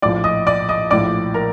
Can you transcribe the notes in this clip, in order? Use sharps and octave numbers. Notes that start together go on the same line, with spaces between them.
A#1 A2 F3 D5 D6
D#5 D#6
D5 D6
D#5 D#6
A#1 A2 F3 D5 D6
A#4 A#5